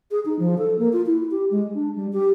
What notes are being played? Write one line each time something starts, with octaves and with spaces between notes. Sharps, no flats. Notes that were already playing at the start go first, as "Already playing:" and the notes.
G#4
D#4
F3
A4
A#3
F4
E4
G4
G#3
D4
G3
G4